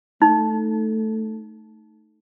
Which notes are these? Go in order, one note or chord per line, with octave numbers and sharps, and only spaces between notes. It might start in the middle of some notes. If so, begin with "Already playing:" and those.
A3 D#4